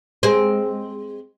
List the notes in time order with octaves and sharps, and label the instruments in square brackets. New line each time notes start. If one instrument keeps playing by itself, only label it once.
[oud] G#3 C4